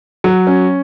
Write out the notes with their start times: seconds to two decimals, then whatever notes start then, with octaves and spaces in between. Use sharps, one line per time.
0.24 F#3
0.47 C#4